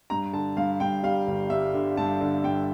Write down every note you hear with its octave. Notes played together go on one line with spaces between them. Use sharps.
G2 A#5
D3 A5
G2 F5
G2 G5
G3 F5
G1
G3 E5
D3
G2 A5
D3
G2 G5